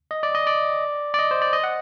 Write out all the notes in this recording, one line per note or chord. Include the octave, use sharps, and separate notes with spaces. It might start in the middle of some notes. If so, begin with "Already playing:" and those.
D#5
D5
D#5
D5
D5
D#5
C5
D5
D#5
F#5